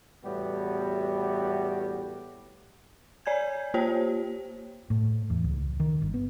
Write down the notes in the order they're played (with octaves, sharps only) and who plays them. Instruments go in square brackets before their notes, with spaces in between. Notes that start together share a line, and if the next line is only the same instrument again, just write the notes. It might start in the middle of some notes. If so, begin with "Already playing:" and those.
[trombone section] E2 A2 G3 B3 F#4 G4
[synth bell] C#5 D5 G#5 G6 G#6
A#3 F4 G4 C5 C#5 G5
[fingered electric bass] A2
E2
C#2
D#3
G1
B3